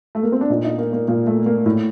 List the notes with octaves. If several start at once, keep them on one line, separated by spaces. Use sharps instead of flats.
A3
A#3
C4
D4
A#2 D#4
D#4
A#3
A#3
A#2 A#3
A3
A#3
A2